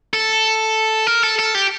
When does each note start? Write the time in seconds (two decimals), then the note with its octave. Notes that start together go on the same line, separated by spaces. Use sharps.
0.13 A4
1.07 A#4
1.23 A4
1.39 A4
1.55 G4